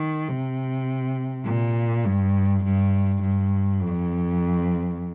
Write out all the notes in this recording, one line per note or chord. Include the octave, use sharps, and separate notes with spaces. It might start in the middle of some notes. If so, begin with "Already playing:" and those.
Already playing: D#3
C3
A#2
G2
G2
G2
F2